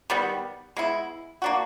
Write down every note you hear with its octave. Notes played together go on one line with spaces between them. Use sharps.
D#3 G3 B3
G#3 B3 E4
A#3 D4 F#4